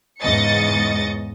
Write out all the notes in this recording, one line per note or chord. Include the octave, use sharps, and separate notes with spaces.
E2 G#2 C#3 D#5 A6 C#7